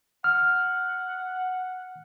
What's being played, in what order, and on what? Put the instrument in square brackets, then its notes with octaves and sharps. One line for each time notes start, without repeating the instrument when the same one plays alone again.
[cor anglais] F#5 [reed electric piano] F6